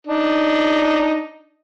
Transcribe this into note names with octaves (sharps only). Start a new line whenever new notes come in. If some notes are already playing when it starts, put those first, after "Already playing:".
D4 D#4